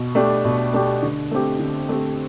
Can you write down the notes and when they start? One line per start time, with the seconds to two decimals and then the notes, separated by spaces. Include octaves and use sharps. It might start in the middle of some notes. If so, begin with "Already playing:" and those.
Already playing: B2
0.15 A3 D4 G4
0.45 B2
0.73 A3 D4 G4
1.03 D3
1.31 A3 C4 G4
1.59 D3
1.89 A3 C4 G4